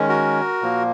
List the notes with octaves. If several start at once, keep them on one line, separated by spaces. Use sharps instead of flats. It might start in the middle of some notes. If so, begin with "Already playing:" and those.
Already playing: D#3 G#3 C#4
F#4 A#4
A#2 F3 A#3